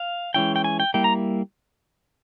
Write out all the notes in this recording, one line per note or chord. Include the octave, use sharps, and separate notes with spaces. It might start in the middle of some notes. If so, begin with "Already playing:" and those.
Already playing: F5
E3 G#3 C#4 E4 G5
G5
G#5
G5
G3 A#3 E4 G5
A#5